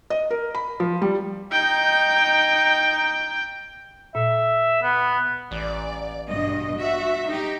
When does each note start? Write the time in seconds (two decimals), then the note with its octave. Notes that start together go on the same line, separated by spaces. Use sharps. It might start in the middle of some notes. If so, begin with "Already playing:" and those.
0.10 D#5
0.30 A#4
0.55 B5
0.80 F3
1.02 G3
1.52 D#4 G5
4.15 A#2 E5
4.82 B3
5.51 A1 D5
6.29 G2 B2 D#5
6.78 F#4 E5
7.27 D#4 G4